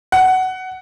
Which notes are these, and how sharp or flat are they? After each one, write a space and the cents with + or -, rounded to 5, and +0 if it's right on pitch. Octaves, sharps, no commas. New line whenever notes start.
F#5 +15